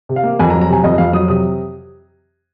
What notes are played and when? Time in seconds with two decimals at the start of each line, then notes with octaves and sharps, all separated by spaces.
0.09 C3
0.16 F5
0.23 A#3
0.39 F2 G#5
0.50 A#5
0.54 F#3
0.61 A#5
0.69 C3 G#5
0.84 F2 D#5
0.98 F2 F5
1.13 F#3 D#6
1.28 C3 D#6